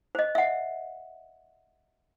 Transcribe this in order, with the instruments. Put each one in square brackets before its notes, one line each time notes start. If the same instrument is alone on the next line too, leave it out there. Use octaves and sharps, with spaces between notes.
[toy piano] C5 D#5
E5 F#5